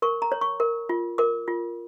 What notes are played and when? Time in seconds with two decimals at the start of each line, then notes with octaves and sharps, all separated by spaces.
0.02 A#4 C#6
0.22 A#5
0.32 C#5
0.41 C#6
0.60 A#4
0.89 F4
1.18 A#4 D6
1.48 F4